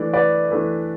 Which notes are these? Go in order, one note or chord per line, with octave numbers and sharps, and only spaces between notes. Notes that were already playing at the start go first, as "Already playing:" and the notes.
Already playing: E3 A3 D4 D5
B4 D5
E3 A3 D4